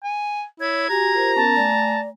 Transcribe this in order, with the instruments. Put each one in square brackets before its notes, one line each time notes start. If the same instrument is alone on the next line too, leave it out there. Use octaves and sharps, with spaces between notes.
[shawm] G#5
[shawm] E4 [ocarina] C#5 [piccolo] G#6
[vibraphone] F#4 G#5 [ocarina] G4 [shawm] A#5
[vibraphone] F4 A#4 C5
[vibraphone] B3 C#4 A#4 [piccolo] A5
[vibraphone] A3 G#5 [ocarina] D5